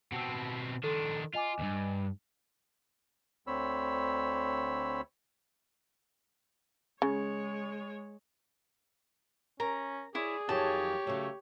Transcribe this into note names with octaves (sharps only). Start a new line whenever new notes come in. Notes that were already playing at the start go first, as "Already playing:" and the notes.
B2 C4 F#5 A5 E6
D#3 D4 A4 C6
F4 D#5 G#5 D6
D2 G2
D2 D3 C4 C#5 B5 E6
C#3 G#3 C#5
C#4 A#4 A#5
E4 G#4 C#5 D5
F2 D#3 F#3 G4 C#5 A5
C#3 F#3 A3